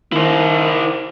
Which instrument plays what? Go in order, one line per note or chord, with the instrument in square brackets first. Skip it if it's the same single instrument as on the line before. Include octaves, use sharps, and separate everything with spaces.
[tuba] D#3 [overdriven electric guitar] E4 C5